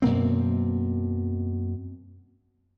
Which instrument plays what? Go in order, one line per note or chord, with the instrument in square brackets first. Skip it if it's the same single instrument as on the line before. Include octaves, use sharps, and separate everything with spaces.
[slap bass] F#2 B2 A#3 C4